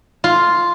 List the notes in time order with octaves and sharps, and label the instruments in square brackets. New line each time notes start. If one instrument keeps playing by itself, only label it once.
[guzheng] F4